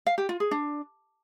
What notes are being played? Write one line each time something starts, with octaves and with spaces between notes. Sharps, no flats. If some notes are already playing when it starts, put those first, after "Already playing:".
F5
G4
F4
G#4
D4